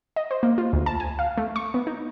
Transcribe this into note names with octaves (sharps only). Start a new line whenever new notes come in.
D#5
C5
A#3
F4
D2
A5
G#5
F5
A3
C#6
B3
D#4